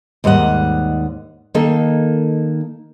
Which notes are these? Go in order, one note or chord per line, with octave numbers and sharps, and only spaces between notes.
D#2 G#2 G3 D#5 F#5
D#3 A#3 D#4 A4